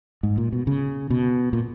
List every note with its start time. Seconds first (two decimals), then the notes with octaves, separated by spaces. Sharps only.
0.23 G#2
0.38 A#2
0.53 B2
0.67 C#3
1.10 B2
1.53 A#2